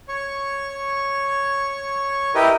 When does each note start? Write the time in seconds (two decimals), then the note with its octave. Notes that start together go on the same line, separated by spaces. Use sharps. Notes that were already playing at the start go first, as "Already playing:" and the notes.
0.09 C#5 C#6
2.35 E4 G4 A#4 B4 D#5